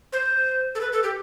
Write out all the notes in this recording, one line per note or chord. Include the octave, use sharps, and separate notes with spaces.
C5
A4
B4
A4
G4